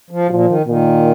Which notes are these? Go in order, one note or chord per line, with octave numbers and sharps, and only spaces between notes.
F3
A#2 F3
D#3
A#2 D#3